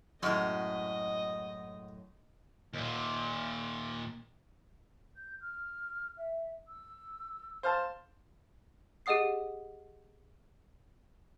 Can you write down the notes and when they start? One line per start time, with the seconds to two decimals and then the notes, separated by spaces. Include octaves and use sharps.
0.23 F#2 A2 G#3 F#4 D#5
2.73 D#2 A#2
5.16 G6
5.41 F6
6.17 E5
6.68 E6
7.63 C5 F5 A5
9.06 G4 G#4 D#5 F#5 D#6 C7